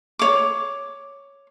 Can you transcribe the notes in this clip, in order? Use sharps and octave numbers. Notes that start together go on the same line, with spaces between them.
C#5 D6